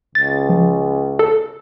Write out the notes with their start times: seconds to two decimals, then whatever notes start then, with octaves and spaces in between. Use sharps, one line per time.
0.15 C#2 A6
0.50 F3
1.19 A4